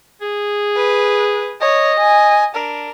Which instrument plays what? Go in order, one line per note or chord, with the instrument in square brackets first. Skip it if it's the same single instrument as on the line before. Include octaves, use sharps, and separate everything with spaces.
[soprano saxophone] G#4
[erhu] B4
[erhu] C#5 [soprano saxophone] D#5
[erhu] G#5
[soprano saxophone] D4 [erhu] A#4